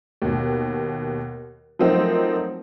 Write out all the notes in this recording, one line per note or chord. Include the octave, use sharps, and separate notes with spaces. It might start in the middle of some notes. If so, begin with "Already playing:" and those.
D#2 B2
F3 F#3 A3 A#3 C4 D#4